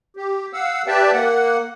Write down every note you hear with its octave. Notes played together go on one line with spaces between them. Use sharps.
G4
F5 F#5 E6
G4 B4 D5 E5 G5 A5
A#3 F#5